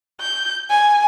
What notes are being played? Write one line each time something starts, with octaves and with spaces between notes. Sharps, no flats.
G6
G#5